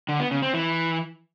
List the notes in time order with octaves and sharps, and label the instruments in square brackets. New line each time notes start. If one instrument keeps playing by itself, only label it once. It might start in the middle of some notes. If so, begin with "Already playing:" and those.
[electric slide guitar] D3
B3
C#3
C4
E3